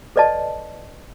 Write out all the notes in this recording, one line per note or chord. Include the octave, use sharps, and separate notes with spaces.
A4 B4 D5 D#5 A5